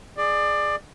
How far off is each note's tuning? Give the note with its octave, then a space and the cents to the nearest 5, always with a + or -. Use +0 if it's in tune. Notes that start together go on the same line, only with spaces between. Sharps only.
G#4 +0 D5 +20